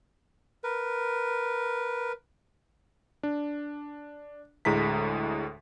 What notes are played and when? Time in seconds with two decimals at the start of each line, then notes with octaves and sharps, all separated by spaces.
0.64 A#4 B4
3.23 D4
4.65 D2 A2 G#3 A#5 B6